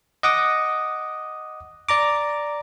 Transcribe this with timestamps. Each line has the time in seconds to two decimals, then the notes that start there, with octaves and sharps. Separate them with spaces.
0.23 D#5 F#5 D6 D#6
1.89 D5 A#5 D6